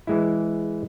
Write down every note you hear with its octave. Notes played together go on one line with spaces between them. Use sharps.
E3 G#3 E4